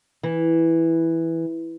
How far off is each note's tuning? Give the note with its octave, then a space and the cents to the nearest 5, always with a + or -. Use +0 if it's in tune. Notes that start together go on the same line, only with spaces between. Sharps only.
E3 -5